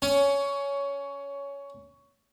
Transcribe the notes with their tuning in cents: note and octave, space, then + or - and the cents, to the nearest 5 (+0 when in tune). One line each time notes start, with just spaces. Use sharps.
C#4 +15